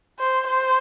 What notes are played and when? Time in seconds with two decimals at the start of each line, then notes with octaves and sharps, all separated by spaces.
0.20 C5
0.48 C5